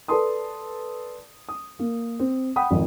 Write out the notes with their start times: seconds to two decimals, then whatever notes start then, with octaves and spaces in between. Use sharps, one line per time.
0.08 A4 B4 D5 A5 C6 D#6
1.49 D#6
1.79 A#3
2.19 C4
2.56 F#5 G5 B5 D#6
2.71 G#1 F2